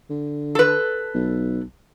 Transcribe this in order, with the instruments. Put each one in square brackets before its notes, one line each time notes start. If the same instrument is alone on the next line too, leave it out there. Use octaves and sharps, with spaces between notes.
[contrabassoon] D3
[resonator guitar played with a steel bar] A4 B4
[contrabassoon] B1